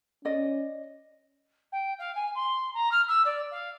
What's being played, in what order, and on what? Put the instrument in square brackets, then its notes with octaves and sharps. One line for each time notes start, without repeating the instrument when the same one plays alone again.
[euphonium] C#4 [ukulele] D5 D#5
[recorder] G5
F5
G#5
C6
A#5
F6
E6
D5
F5